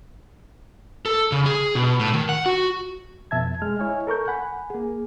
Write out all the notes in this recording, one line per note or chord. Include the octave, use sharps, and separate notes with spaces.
A4
C#3
G#4
B2
A2
D#3
F#5
F#4
F2 B2 E5 A5 G#6
G#3 F6
E4 C#5 D#5 G#5
A4 A#4 C#6 G6
F#5 G#5 B5
A#3 G#4